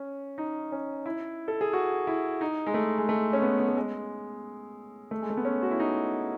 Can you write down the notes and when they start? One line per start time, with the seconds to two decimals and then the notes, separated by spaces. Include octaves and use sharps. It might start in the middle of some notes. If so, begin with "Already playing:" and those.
Already playing: C#4
0.38 D#4
0.72 C#4
1.06 E4
1.48 A4
1.61 G#4
1.73 F#4
2.07 E4
2.41 D#4
2.67 G#3
2.74 A3
2.98 G#3
3.09 A3
3.33 C#4
3.42 B3
3.60 B3
3.68 A3
3.77 G#3
5.11 A3
5.22 G#3
5.30 A3
5.37 B3
5.45 C#4
5.62 F#4
5.71 E4
5.80 D#4